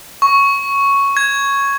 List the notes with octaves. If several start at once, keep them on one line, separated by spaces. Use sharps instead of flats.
C#6
G#6